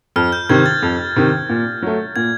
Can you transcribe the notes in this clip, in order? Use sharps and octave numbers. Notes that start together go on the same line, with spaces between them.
F2 F6
G6
C3 D#3 G#6
A6
F2
C3 D#3
A#2
F#3 A3
A#2 G#6